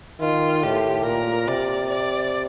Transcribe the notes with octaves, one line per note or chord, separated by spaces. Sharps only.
D#3 F4
A2 G4
A#2 A#4
C3 D5
D5